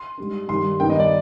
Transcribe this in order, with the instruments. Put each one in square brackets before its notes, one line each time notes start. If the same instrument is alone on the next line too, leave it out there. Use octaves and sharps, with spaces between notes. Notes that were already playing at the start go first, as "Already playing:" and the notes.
Already playing: [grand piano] C6
G#2 G3 D4
G2 D#3 G3 C6
G2 D#3 B3 D4 G5
D#5
D5